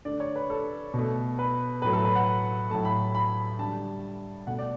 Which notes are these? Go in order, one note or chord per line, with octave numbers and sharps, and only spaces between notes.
D3 A3 D5
C#5
B4
A4
B2
A3
B4
A2 F#3 A3 B4
A4
B4
F#5
A2 F#3 A3 A5
B5
B5
D3 G3 A5
B2 A3 F#5
D5